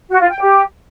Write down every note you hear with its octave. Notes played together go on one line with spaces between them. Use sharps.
F#4
F4
G5
G4